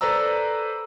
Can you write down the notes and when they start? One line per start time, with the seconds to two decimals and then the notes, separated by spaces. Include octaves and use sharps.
0.01 A4 B4 C5 D5 A#5 E6